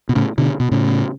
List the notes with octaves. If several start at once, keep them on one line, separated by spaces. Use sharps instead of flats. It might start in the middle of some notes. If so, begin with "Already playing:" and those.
B2
A2 C#3
B2 D3
B2
A2 C#3